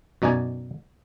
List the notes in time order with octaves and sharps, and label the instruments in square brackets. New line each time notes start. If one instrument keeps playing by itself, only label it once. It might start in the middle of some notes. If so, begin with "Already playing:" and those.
[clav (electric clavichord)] F#2 B2 D#4 D5 G#5